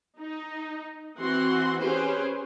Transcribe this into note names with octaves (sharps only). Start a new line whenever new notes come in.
D#4
E3 C4 F#4 F#5 C6
C#4 G4 G#4 B4 C5